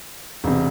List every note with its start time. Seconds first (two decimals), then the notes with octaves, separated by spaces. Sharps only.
0.44 E1 C3